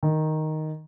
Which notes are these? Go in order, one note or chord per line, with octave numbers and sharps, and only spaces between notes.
D#3